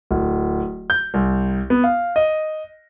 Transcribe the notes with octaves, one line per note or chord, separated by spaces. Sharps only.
D1
G6
C2
B3
F5
D#5